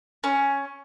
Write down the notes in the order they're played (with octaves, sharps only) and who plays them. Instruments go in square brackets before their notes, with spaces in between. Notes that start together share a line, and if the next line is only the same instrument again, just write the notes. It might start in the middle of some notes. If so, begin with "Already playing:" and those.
[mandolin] C#4